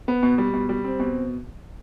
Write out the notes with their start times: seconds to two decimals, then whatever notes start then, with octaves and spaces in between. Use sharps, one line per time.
0.08 B3
0.23 B2
0.38 G3
0.53 B2
0.69 G3
0.84 C4
0.99 B2